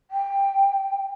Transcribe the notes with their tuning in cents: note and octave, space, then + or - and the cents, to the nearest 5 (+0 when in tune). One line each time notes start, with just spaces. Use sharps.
G5 +15